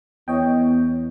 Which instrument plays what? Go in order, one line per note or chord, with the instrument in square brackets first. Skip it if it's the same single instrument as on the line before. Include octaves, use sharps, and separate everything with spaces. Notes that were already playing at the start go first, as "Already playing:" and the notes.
[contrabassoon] E2 [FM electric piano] C#5 D#5 G5